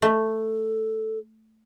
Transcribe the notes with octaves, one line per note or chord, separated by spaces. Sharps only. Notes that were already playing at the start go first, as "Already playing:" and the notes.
A3 A4